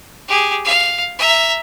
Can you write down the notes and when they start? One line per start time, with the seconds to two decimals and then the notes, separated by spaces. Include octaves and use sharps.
0.28 G4 G#4
0.65 F5
1.19 E5 A#5